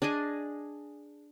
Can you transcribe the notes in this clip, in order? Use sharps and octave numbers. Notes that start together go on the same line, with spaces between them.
D4 G#4 D#5 G#5